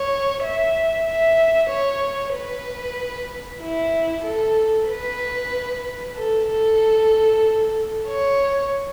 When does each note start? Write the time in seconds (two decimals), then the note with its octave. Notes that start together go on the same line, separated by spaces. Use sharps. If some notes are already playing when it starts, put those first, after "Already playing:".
Already playing: C#5
0.43 E5
1.07 E5
1.70 C#5
2.34 B4
3.61 E4
4.24 A4
4.88 B4
6.16 A4
6.47 A4
8.08 C#5